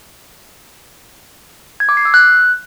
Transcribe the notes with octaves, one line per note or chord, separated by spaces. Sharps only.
G#6
D6
C7
E6
F#6